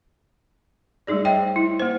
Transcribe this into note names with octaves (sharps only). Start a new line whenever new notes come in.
G3 A3 D#4 G#4 D5
C5 C#5 D#5 E5 G5
E4
A#3 C5